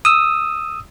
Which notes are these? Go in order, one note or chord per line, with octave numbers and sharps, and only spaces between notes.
D#6 E6